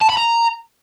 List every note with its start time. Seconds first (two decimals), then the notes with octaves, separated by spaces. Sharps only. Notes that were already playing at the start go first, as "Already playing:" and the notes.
0.01 A5
0.09 B5
0.17 A#5